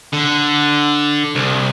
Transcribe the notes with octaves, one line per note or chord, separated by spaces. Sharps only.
D3
C2